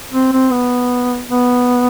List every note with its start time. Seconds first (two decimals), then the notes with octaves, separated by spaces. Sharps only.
0.13 C4
0.32 C4
0.51 B3
1.30 B3